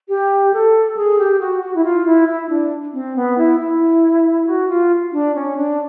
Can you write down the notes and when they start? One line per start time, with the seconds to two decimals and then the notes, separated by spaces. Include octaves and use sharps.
0.09 G4
0.53 A4
0.97 G#4
1.19 G4
1.40 F#4
1.62 F#4
1.75 E4
1.84 F4
2.06 E4
2.29 E4
2.49 D4
2.93 C4
3.16 B3
3.38 E4
3.60 E4
4.47 F#4
4.69 F4
5.12 D4
5.35 C#4
5.56 D4